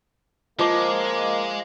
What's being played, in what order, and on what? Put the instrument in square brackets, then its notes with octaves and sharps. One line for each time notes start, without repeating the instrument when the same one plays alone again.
[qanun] F3 [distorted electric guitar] G#3 [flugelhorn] A#3 [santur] D#5 D6